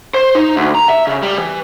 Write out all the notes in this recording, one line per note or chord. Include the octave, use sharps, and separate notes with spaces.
C5
D#4
D2
A#5
E5
C#3
G3
E3